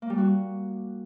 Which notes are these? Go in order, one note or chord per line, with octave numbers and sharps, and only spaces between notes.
A#3
G3
F#4